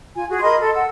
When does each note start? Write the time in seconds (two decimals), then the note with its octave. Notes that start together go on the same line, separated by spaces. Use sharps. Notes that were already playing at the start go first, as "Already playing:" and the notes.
0.14 F4 G#5
0.28 F#4 G#4
0.42 A#4 D#5 B5 C6
0.57 A4
0.72 F#5 E6